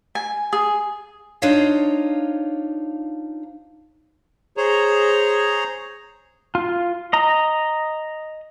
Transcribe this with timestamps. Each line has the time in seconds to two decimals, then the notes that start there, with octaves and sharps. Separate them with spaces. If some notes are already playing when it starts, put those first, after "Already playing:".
0.15 G#5
0.53 G#4
1.42 D4 D#4 F4 C5 C#5 F5
4.57 G#4 C5 C#5 A#5
6.55 F4
7.13 D#5 A#5